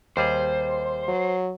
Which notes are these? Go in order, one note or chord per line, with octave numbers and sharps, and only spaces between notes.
D#2 G3 G#4 C5
F#3